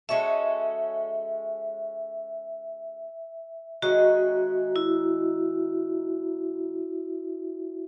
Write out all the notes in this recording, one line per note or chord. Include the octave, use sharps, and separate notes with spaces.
G#3 C#4 F#4 A4 E5
D#3 G#3 C#4 F#4
E4